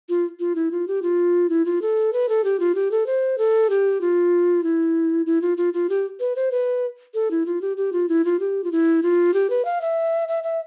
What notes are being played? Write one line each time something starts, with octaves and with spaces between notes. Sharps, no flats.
F4
F4
E4
F4
G4
F4
E4
F4
A4
B4
A4
G4
F4
G4
A4
C5
A4
G4
F4
E4
E4
F4
F4
F4
G4
B4
C5
B4
A4
E4
F4
G4
G4
F4
E4
F4
G4
F4
E4
F4
G4
B4
F5
E5
E5
E5